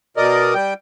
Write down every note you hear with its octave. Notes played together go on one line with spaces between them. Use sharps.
B2 A#4 D5 D#5
G3 G5